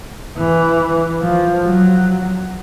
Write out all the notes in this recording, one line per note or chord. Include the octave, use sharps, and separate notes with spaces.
E3
F3
F#3